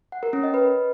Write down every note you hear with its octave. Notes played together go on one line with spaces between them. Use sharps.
F#5
A#4
C#4
D#5
B4